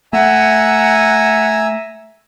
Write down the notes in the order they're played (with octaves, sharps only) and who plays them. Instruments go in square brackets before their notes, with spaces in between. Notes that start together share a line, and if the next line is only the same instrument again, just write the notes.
[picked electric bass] A3 [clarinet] E5 [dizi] F#5 [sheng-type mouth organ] G#5 A#5 E6